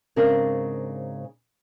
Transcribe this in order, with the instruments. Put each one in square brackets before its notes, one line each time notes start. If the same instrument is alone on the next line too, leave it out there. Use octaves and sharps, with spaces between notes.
[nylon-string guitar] G#2 C#3 C4 D4 A#4